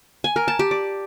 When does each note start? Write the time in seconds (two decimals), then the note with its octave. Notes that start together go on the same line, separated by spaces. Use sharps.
0.24 G#5
0.36 A#4
0.48 A5
0.59 G4
0.71 D5